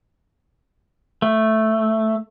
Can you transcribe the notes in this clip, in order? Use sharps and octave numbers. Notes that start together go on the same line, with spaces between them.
A3